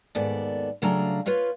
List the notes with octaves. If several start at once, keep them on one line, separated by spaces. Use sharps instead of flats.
D#2 G#2 B3 A4 D5
C#3 F#3 A3 D4 F5 A#5
F4 B4 C#5 F5